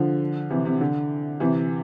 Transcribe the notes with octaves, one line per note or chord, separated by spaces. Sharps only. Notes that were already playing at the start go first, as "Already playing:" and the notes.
Already playing: D3 F3
C3 E3
C3
D3
C3 E3